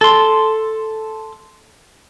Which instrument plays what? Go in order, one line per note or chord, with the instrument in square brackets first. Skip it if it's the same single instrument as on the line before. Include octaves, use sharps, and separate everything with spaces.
[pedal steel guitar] A4 C6